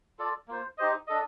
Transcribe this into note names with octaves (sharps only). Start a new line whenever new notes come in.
F4 A4 D5
A#3 F4 C5
D#4 G4 C5 D#5
D4 A4 D#5